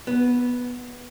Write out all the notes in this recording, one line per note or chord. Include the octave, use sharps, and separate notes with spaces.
B3